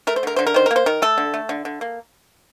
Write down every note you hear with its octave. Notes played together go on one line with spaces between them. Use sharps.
A3 A#4
C5
D3 A#4
D3 C5
A#4
D#3 C5
A#4
A#3
C5
D#3 A#4
A3 A4
D3
A3
D3
D3
A#3